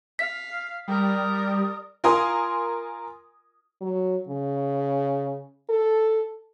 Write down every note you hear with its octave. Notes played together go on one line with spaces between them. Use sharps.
F5 B6
G3 A#4 D5 D#6
F4 A#4 G#5 C6 D#6
F#3
C#3
A4